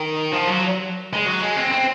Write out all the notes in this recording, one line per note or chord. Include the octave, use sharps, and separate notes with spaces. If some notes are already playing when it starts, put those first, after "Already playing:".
Already playing: D#3
F3
F#3
G#3
F#3
G#3
C4
C4